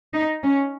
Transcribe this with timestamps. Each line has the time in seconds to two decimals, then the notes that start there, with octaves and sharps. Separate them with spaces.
0.13 D#4
0.43 C#4